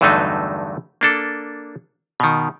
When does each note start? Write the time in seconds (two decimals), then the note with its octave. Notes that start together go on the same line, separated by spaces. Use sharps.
0.01 E2 G2 D3 F#3 A3 D#4
1.01 A#3 D4 A4
2.20 B2 D#3